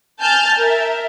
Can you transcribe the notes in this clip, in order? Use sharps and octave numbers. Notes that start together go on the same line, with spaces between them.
G#5 A5 F6 G6 A6
A#4 E5